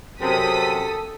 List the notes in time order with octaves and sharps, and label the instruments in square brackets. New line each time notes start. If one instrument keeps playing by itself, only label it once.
[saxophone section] F#2 C3 [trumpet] A4 [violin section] D#6 B6